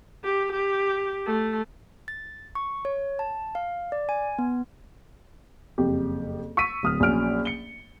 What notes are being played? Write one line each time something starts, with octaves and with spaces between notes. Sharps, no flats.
G4
G4
A3
A6
C#6
C#5
A5
F5
D5
G#5
B3
F#1 F2 G4
C#6 E6 B6 D#7
D1 D#6 F6
A#1 F#3 C#4 F6 D7
C#7 G7